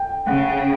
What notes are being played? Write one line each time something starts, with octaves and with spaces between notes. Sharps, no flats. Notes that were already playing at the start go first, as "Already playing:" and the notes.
Already playing: G5
C#3 F#5